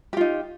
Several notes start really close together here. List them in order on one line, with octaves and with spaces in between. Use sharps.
G4 F4 D#4